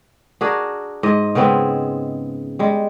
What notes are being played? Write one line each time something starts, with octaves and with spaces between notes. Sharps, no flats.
D4 F#4 G#4 A#4
G#2 D#5
C#3 G#3 B3 C4
G3 G#3